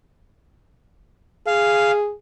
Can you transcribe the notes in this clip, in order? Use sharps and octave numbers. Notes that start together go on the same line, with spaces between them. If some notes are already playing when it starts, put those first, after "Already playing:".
G#4 F5